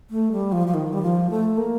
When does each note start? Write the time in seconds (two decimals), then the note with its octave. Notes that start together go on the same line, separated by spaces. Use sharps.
0.10 A3
0.32 G3
0.52 F3
0.67 F3
0.74 D#3
0.93 G3
1.03 F3
1.30 A3
1.57 A#3